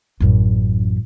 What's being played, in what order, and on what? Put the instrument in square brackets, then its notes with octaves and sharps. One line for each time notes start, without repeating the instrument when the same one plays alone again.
[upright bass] A1 F#2